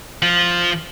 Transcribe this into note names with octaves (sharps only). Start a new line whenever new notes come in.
F3 F4